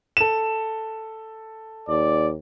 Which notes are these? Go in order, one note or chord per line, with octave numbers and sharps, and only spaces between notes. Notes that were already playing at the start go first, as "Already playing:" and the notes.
A4 E7
D#2 D5